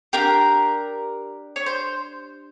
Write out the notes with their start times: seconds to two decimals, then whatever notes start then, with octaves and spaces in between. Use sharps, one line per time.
0.13 D4 G4 A#4
1.56 C#5
1.66 C5